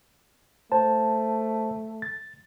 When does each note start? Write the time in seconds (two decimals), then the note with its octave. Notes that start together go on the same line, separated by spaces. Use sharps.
0.72 A3 C5 A5
2.02 A6